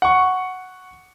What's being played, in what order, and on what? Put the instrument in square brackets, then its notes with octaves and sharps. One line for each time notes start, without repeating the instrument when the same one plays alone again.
[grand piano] F#5 C#6